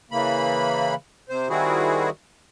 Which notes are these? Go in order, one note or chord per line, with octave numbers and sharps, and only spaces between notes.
C#3 E3 A#3 B5
C3 C5
D#3 G3 C4 E4 F#4 G#4